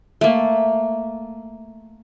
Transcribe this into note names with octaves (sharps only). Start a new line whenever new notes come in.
A3 A#3